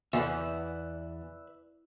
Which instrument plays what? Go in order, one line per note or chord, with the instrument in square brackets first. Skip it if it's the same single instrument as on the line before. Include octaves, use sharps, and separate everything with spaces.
[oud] E2 [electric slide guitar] B4 D5 E5